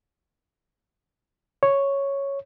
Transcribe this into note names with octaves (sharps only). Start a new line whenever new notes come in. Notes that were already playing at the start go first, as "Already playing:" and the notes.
C#5